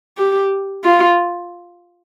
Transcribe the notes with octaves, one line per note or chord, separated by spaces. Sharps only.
G4
F4